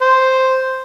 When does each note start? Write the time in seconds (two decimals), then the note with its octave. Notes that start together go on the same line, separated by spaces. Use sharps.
0.02 C5